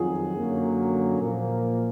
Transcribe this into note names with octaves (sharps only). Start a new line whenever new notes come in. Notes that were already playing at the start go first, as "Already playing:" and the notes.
Already playing: F2 D#3 F#3 F4 F#4 G#4
F#2 D3 F#3 A#3
A#2 F3 A#3